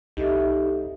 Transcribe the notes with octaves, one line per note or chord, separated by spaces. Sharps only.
C2 D#4 G4 A4 E5